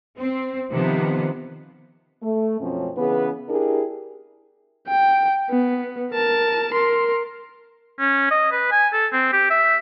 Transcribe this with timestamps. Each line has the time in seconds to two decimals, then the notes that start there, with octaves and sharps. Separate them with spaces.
0.18 C4
0.71 C3 D#3 F3 B3
2.23 A3
2.60 F#2 B2 F3 C4 C#4
2.96 C#3 E3 B3 G#4 B4
3.49 D4 E4 G4 G#4 A#4
4.88 G5
5.50 B3
6.12 A#4 A5
6.72 A#4 C6
7.99 C#4
8.31 D#5
8.52 B4
8.72 G#5
8.93 A4
9.13 C4
9.33 G4
9.50 E5